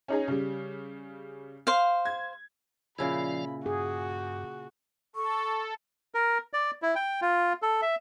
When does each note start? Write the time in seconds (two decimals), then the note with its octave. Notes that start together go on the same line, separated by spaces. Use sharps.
0.08 C#4 D#4 G#4
0.28 C#3 G3
1.67 C5 F5
2.05 G#6
2.99 A#2 C#3 F3 E4 F4 D5 B5
3.66 G2 F#4 G#4
5.16 A4 C#6
6.15 A#4
6.53 D5
6.82 E4
6.95 G5
7.21 F4
7.62 A4
7.82 E5